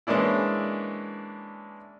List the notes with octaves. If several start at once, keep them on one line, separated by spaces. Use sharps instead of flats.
E3 G#3 A#3 C#4 D4 E4